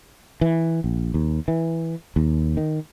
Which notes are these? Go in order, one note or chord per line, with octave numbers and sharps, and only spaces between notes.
E3
A#1
D#2
E3
D#2
D#3